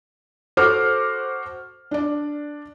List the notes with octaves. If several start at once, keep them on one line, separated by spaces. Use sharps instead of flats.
F#4 A4 C5 F#5 D6 F6
D4 D5